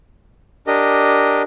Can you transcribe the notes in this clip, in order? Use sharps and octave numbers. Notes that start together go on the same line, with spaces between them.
D4 G4 A#4 D#5